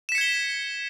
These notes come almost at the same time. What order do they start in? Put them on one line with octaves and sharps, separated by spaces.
E7 B6 C#7 G#6 G7